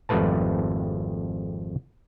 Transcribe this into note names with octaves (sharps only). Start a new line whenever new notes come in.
G#1 F2 G3 A3 B4 A5